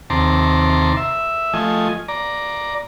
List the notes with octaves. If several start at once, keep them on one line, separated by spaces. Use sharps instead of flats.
D#2 C3 A5 A#5 C6 D6
E5
F3 A3 D#5 G#5
D5 A#5